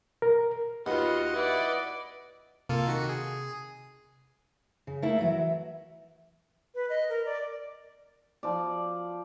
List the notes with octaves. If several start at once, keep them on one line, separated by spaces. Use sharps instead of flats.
A#4
D#2 F4 F#4 B4 D#5 F#5
E4 B4 D5
C3 A#3 F4 A4
D#3 F#4 C#7
G#4
C#3
A3 A#3 E4 E5
E3 F#3 E5
B4
D#5
A#4
D5
F3 D5